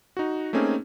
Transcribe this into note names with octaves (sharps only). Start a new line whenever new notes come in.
D#4 F#4
A3 A#3 C4 C#4 D#4 G#4